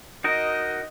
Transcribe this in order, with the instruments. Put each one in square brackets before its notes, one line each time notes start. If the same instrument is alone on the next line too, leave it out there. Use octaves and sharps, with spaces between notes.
[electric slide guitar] D#4 F#4 A#4 [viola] D#5